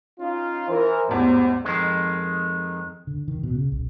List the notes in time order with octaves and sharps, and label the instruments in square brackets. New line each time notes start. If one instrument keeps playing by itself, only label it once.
[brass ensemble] C#4 D#4 F4
[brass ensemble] E3 A#4 [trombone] C5
[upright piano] A1 E2 [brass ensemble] G#2
[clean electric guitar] F2 D#3 G#3
[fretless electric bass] D3
D#3
B2
C#3
B1